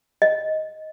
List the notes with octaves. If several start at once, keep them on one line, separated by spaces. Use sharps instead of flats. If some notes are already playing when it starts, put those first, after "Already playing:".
D#5